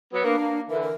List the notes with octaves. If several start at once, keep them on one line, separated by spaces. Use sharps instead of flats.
F#3 B3
A#3 B3 D4
A#3
D3 E3 A#4
A#4